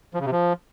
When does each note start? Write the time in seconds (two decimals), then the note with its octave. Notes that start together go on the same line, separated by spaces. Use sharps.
0.14 F3
0.20 C#3
0.26 C3
0.32 F3